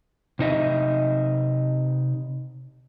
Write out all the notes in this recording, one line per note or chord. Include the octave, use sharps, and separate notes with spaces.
C3 D#4 D#5 E5